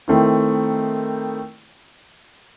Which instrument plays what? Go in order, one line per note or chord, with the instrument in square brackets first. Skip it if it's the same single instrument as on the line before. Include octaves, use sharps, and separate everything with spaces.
[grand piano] D#3 A3 C4 E4